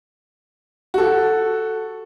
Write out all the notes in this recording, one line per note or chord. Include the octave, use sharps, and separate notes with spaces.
F#4 A4